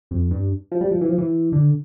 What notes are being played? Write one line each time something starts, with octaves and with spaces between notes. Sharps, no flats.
F2
G2
F3
G3
F3
E3
F3
E3
D3